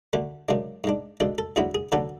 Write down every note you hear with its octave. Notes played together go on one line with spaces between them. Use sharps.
D2 D3 A3
F#2 C#3 G#3 D4
G#2 G#3 D4
C#2 B2 G#3 D4 A4
A4
D2 D3 F#3 C#4 E4 G#4
G#4
D2 D3 F#3 B3 D4 A4